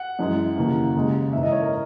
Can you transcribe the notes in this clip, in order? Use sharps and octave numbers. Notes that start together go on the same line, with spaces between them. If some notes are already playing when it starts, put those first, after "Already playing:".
Already playing: F#5
F#2 E3 G#3
D#2 C#3 E3 A#3
D#2 C#3 G#3
G#2 E3 A#3 E5
D#5
C#5
A#4